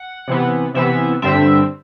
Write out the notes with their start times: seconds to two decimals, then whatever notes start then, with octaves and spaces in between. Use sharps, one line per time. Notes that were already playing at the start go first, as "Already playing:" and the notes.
Already playing: F#5
0.28 C3 E3 B3
0.74 C3 E3 B3 E5
1.22 G2 D3 G3 C4 E5